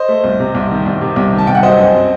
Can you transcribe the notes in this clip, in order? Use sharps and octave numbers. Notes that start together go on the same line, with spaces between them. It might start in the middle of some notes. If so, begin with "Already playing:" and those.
Already playing: C5 D#5
A3
C2
C3
C2
D#3
C2
C3
C2
D#3
A5
C2 G5
F#5
F#3 C5 D#5
F#2
C4